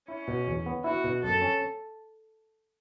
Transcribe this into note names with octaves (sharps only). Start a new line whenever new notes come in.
C#4 E4
B2
E2
B3
E4 F#4
B2
F#2 A4
C#4